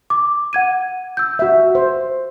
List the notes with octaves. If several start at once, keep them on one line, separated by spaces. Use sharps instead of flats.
D6
F#5 G#6 D#7
E6 G6
F#4 E5
C5